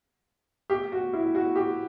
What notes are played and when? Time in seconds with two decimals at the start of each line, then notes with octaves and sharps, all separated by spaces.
0.70 G4
0.92 F#4
1.13 E4
1.35 F#4
1.56 G4